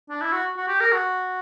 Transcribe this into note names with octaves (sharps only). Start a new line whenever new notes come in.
D4
E4
F#4
F#4
G4
A#4
F#4